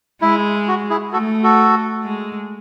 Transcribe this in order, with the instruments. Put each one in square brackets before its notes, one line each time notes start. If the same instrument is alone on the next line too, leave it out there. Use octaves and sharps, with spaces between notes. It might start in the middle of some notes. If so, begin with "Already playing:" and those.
[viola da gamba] G#3 [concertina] E4
[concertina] F#4
E4 G#4
[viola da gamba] A3 [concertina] F#4 A4
[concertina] F#4 A4
[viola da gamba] G#3